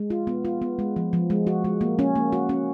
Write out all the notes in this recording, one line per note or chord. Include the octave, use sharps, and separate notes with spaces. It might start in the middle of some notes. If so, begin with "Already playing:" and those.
Already playing: G#3
F4
B3
F4
B3
G#3
F3
F3
G#3
F#4
G#3
A#3
C#4
A#3
F#4
C#4